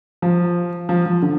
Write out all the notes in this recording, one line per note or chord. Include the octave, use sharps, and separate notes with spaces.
F3
F3
F3
D3